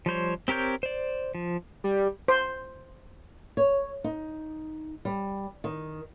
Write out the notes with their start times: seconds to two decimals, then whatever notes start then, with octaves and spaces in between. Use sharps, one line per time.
0.06 F3 G3 C5 C#5
0.48 C4 G4 A#4 C#5 G6
0.83 C5 D5
1.35 F3
1.84 G3
2.28 C5
3.57 C#5
4.04 D#4
5.05 G3
5.64 D#3